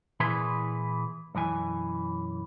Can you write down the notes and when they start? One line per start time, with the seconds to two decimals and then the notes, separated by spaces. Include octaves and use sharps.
0.20 A#2 E3 E4 G#4 B4 C6
1.35 B1 F#2 E3 G#5